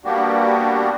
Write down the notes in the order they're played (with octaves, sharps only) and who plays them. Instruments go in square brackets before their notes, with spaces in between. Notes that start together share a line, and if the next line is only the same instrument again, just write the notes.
[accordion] G3 A#3 B3 D4 F#4 G4